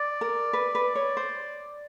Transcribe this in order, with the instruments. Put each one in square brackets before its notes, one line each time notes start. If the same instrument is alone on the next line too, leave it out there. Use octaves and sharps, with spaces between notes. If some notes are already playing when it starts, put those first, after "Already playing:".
Already playing: [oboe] D5
[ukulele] A#4
B4
B4
C#5
C5